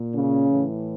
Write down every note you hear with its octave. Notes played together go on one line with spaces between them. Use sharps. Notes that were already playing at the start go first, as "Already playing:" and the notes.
Already playing: A#2
C#3 C#4
A2 E3